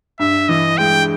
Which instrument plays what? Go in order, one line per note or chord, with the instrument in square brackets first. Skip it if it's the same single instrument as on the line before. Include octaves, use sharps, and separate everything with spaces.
[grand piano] G2 [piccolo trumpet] E5
[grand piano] E3 [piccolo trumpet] D#5
[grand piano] G#3 [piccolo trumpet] G5